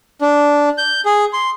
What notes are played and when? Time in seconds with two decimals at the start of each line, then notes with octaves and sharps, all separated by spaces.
0.22 D4
0.78 G6
1.05 G#4
1.33 C6